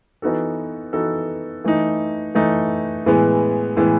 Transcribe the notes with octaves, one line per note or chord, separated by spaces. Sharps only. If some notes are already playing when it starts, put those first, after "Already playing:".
E3 B3 D#4 F#4 A4
E3 B3 D#4 F#4 A4
E3 A3 D#4
E3 A3 D#4
A2 E3 G#3 B3
A2 E3 G#3 B3